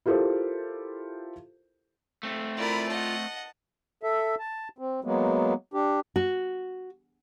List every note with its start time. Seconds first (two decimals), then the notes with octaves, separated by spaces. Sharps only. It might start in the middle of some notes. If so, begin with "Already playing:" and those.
0.06 E4 F4 G4 A4 A#4 C5
2.23 A3 C4
2.57 E4 F4 A#4 D5 B5
2.90 D#5 F#5 A5
4.03 A4 E5
4.39 A5
4.78 C4
5.04 F#3 G#3 A#3 B3
5.74 D4 G4
6.16 F#4